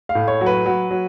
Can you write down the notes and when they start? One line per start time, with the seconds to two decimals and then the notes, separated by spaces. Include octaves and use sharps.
0.09 F5
0.15 A2
0.28 C#5
0.41 F#3
0.46 B4
0.66 F#3
0.91 F#3